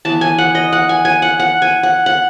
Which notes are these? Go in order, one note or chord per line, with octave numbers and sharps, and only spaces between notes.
E3 B3 A5
G#5
F#5
D#5
F#5
G#5
G#5
F#5
F#5
G#5
F#5
F#5